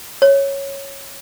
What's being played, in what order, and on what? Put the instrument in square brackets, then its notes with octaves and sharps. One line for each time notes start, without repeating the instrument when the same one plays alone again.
[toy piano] C#5